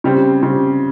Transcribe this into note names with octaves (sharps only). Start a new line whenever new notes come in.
C#3 G3 C4
C#3 G3 C4